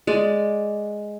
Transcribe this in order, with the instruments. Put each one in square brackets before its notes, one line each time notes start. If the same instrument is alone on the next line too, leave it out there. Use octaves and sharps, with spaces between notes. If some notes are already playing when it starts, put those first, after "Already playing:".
[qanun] G#3 D5